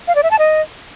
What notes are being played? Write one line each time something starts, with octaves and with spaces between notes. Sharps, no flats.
F5
D5
E5
A5
D#5